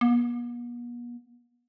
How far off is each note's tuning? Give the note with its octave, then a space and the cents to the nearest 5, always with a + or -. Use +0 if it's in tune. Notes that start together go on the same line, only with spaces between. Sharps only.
B3 -45